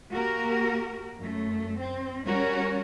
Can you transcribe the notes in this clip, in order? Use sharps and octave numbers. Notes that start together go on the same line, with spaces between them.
A#3 F#4 G4 A#4
F#2 A3
C4
G3 C#4 F#4 A#4 C#5